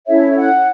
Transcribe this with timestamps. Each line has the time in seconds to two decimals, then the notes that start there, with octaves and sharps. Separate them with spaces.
0.07 C#4 E4 A4 C#5 E5
0.37 F#5